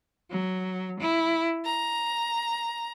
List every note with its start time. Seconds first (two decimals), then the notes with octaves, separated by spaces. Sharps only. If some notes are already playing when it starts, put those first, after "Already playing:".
0.30 F#3
0.99 E4
1.65 A#5